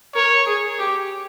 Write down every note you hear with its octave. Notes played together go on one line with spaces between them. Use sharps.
A#4 C#5
G#4
G4